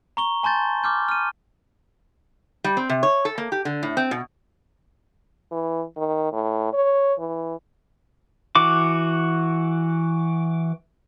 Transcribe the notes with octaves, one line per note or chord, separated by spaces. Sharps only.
A#5 C#6 G7
G#5 A5 C6 G6 A6
D6 F6 G6
F6 D#7
G3
C4
C3
C#5
A4
A#3
G4
D3
A2
C4
B2
E3
D#3
A2
C#5
E3
E3 F#4 D6